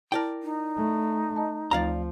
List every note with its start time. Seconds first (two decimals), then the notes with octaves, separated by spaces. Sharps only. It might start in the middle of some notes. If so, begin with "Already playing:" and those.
0.12 E4 A#4 D5 G5 A5
0.43 D#4
0.77 A3
1.36 D#5 A5
1.71 D2 F3 A3 D5 F5 A#5 A6